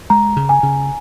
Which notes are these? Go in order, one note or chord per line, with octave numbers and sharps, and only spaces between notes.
G#3 A#5
C#3
G#5
C#3